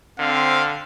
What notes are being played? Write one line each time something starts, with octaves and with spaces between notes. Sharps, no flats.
D3 C4 F5